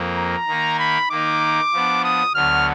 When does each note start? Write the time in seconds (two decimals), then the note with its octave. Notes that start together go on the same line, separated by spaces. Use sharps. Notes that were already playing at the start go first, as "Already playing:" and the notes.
Already playing: F2 F3 A#3
0.18 A#5
0.48 D#3 A#3 D#4 A#4
0.80 B5
1.10 D#3 A#3 D#4 D6
1.73 F3 B3 D4
2.04 D#6
2.35 D2 D3 F#3 B3 F6